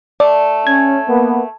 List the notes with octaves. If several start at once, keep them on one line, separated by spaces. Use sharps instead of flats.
A3 D5
C#4 G#6
A#3 B3